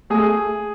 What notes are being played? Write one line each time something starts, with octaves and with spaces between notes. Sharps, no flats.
A3 G#4